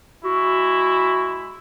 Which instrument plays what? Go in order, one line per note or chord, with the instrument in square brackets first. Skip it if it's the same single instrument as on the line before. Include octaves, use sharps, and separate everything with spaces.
[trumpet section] G#3 E4 [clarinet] F#4